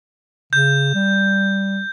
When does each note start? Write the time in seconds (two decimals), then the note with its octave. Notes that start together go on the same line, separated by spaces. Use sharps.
0.53 C#3 G6
0.95 G3